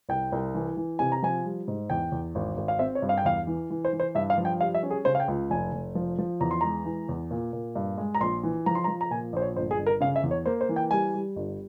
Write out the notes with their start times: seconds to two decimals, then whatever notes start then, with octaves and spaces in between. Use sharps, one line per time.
0.09 C2 G5
0.32 C2
0.55 E3
0.77 E3
0.99 C3 G#5
1.12 A#5
1.23 F3 G#5
1.45 G3
1.68 G#2
1.90 E2 G5
2.12 E2
2.35 G#1
2.57 G#1
2.68 F5
2.79 C4 E5
2.95 C#5
3.02 G2
3.09 F5
3.18 G5
3.25 E2 F5
3.47 E3
3.70 E3
3.85 C5
3.93 E3
4.00 C5
4.15 G2 E5
4.30 F5
4.38 F3
4.45 G5
4.60 G3 F5
4.74 E5
4.83 C#4
4.90 G#4
5.05 C#3 C5
5.15 F5
5.20 G5
5.28 C#2
5.50 F1 G#5
5.73 F1
5.95 F3
6.18 F3
6.41 E2 A#5
6.51 C6
6.61 G#3 A#5
6.85 E3
7.09 E2
7.31 A#2
7.53 A#2
7.75 G2
7.98 G#3
8.15 A#5
8.21 A#1 C6
8.43 E3
8.66 F3 A#5
8.75 C6
8.84 A#5
8.88 F3
9.01 A#5
9.10 A#2 G#5
9.33 A#1 C5
9.42 C#5
9.56 G1 C5
9.71 G#4
9.79 G1
9.86 A#4
10.00 C#3 F5
10.16 E5
10.23 E2
10.31 C#5
10.46 A#3 C5
10.61 C5
10.69 E3
10.76 G5
10.91 G3 G#5
11.14 G3
11.36 G1